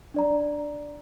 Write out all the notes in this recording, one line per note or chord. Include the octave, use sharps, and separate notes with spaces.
D4 D5 A#5